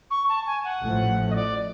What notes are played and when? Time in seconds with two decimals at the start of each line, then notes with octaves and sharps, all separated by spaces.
0.11 C#6
0.29 A5
0.47 G#5
0.65 F#5
0.82 A1 A2 F3 A3
1.30 D#5
1.36 D5